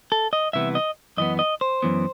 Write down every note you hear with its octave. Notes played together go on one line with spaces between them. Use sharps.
A4
D#5
C2 C3 E3 B3 E5
D#5
F#2 E3 B3 D#5
D#5
C5
F#2 E3 B3